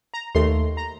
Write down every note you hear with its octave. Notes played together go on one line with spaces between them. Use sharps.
A#5
D#2 D#3 A3 C6
A#5